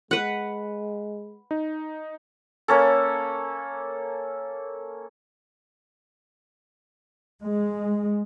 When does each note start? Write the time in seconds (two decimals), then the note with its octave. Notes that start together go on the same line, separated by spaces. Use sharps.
0.11 G#3 B4 F#5
1.51 D#4
2.68 A#3 C#4 A4
7.42 G#3